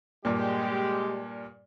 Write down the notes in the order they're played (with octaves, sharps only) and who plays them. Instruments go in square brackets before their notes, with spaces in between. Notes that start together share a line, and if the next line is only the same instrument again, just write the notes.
[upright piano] G2 A#2 [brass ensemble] G#3 G4